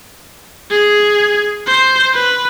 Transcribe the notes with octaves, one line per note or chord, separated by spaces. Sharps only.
G#4
C5
B4